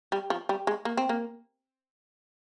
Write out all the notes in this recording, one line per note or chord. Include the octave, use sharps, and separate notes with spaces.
G3
F3
G3
G#3
A#3
C4
A#3